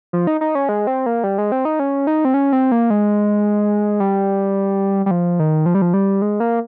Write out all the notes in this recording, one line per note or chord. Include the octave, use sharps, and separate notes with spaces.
F3
D#4
D#4
C#4
G#3
C4
A#3
G3
G#3
C4
D#4
C#4
D#4
C4
C#4
C4
A#3
G#3
G3
G3
F3
D#3
F3
G3
F3
G3
G#3
A#3